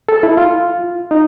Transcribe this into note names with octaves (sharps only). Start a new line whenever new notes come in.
A4
E4
F4
D#4